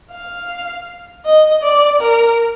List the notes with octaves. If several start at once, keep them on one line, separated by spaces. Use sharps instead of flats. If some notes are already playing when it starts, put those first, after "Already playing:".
F5
D#5
D5
A#4